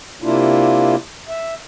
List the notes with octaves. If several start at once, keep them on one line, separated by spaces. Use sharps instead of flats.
C3 A#3 D4 E4 F4
E5